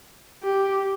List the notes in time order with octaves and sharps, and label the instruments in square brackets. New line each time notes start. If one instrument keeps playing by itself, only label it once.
[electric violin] G4